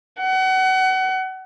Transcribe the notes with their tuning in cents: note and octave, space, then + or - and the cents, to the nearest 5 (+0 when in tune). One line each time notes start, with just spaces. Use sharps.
F#5 +30